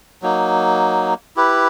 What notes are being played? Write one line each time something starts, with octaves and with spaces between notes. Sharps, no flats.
F#3 A#3 D#4
E4 G4 B4